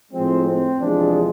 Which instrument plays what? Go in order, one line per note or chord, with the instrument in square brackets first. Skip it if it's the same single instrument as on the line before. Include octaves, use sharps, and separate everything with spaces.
[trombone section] A2 F3 G#3 C4
C4
E2 C3 F3 G#3 D4